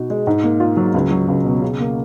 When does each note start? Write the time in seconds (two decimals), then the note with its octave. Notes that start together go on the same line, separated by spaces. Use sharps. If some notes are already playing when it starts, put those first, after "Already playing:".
Already playing: B2 D#4 F#4
0.10 G#3
0.27 G#2
0.44 A#3
0.60 F4
0.77 F#3
0.94 C#2
1.11 F#3
1.28 C#2
1.45 B2
1.62 C#3
1.79 A#3